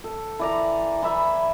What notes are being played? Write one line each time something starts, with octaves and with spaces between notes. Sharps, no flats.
A4
E3 D5 A#5
E3 E5 B5